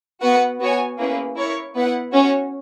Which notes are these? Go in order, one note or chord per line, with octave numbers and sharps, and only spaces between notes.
B3 F#4 B4 F#5
B3 F#4 C#5 G#5
A#3 C#4 E4 G#4 B4
E4 A#4 C#5
B3 E4 B4 F#5
C#4 F#4 C#5